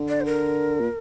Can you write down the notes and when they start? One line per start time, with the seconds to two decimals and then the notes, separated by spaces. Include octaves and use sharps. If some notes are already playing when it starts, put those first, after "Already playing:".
Already playing: D3
0.08 D5
0.21 C5
0.26 A#4
0.81 A#2